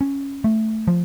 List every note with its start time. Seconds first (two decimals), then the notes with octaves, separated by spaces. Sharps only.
0.01 C#4
0.44 A3
0.88 F3